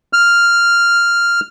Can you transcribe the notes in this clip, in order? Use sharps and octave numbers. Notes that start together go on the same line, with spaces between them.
F6